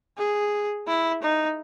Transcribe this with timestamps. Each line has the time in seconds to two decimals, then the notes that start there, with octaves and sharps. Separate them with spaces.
0.18 G#4
0.87 E4
1.22 D#4